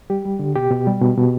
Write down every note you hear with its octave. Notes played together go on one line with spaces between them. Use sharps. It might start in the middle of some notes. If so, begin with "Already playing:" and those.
G3 G4
G3
D3
B2 G4
B2
G3
B2
B2